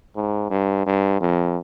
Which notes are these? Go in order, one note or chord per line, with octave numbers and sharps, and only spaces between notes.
G#2
G2
G2
F2